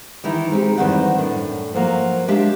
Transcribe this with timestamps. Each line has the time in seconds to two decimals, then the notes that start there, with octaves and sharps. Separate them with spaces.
0.24 D#3 E3 D#4 E4
0.51 G#3 C4 D#4 G4
0.78 E2 G2 D#3 C4 F#5
1.18 F#2 A2 D4
1.74 F3 F#3 A#3
2.28 G#3 D4 G4 E5 F5